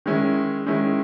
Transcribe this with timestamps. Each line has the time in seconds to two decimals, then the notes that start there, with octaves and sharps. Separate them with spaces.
0.06 D#3 G#3 C#4 E4
0.66 D#3 G#3 C#4 E4